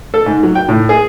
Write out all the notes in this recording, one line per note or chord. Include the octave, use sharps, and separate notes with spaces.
A4
G#2
F#3
G5
A2
G#4